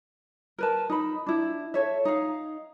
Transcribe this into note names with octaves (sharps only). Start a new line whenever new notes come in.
A#4 B4 A5
D#4 B5
D4 E4
A4 C#5 E5
D#4 F5